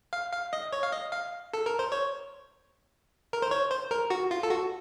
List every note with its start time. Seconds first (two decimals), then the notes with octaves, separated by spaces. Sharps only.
0.13 F5
0.32 F5
0.53 D#5
0.73 C#5
0.83 F5
0.92 D#5
1.12 F5
1.54 A4
1.66 A#4
1.79 C5
1.92 C#5
3.33 A#4
3.42 C5
3.51 C#5
3.71 C5
3.91 A#4
4.10 F#4
4.31 F4
4.43 A4
4.50 F#4